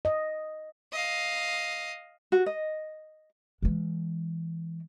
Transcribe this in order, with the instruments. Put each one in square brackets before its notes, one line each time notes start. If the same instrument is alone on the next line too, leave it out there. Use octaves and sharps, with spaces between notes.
[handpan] D#5
[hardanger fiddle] D#5 F5
[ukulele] F#4
D#5
[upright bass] E3 G#3